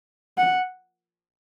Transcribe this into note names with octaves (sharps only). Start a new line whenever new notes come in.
F#5